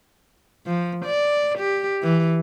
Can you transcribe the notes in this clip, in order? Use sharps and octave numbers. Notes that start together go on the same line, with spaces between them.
F3
D5
G4
E3